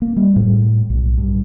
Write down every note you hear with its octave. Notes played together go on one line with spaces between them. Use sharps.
A#3
G3
A2
B1
G2